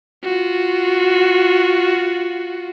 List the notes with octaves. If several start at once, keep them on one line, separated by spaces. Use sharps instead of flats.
F4 F#4